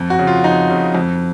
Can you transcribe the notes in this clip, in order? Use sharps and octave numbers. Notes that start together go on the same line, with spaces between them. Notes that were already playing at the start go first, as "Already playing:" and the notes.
Already playing: F2
F#4
C#3
F4
F2 D#4
C#3
F2